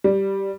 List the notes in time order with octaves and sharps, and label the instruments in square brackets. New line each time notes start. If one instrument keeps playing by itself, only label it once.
[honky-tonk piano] G3